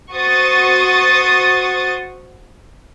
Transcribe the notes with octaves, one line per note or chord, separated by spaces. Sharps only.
F#4 C5 C#6 D#6 A6